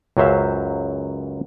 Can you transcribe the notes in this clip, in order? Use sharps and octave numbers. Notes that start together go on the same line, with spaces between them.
C#2 F#2 F#3 C5 E5 F5